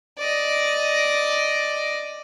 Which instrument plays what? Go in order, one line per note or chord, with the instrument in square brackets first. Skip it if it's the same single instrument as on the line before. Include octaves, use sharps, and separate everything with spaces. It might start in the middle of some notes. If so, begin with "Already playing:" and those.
[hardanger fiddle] D5 D#5